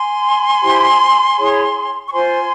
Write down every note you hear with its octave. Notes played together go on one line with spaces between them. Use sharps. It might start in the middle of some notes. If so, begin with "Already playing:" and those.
Already playing: G#5 C6
E4 G4 C5
E4 G#4 C#5
C#6
F4 C5 G#5 C6